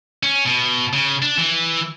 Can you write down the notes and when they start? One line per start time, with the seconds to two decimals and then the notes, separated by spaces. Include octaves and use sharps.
0.23 C#4
0.46 B2
0.93 C#3
1.22 D4
1.38 E3